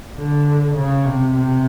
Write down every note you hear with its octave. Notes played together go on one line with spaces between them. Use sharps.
D3
C#3
C3
C3